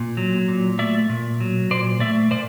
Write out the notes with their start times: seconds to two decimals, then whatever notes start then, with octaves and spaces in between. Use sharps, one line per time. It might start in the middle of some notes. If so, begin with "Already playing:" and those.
Already playing: A#2
0.17 F#3
0.48 A#2
0.79 A3 D5 E5
1.09 A#2
1.41 F#3
1.71 A#2 C5 D5
2.00 A3 D5 E5
2.31 A#2 C5 D5